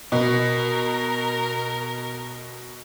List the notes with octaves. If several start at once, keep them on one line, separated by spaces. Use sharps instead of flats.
B2 A#4